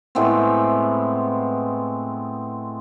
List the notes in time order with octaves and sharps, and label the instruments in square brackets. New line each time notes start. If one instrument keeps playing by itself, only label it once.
[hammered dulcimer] A2 G#3 B3 C4